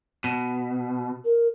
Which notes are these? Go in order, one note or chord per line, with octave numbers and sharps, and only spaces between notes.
B2
A#4